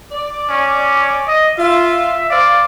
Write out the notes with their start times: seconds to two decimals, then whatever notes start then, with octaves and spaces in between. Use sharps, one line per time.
0.12 D5
0.49 C#4
1.27 D#5
1.58 F4 E5
2.30 C5 D5 F5